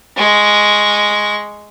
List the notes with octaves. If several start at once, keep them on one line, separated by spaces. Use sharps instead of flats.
G#3 C#6